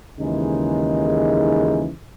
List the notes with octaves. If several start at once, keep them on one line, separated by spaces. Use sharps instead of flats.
D#2 C#3 E3 G#3 D#4